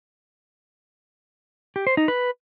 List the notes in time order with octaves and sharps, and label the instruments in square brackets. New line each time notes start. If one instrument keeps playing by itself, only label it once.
[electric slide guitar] G4
C5
D#4
B4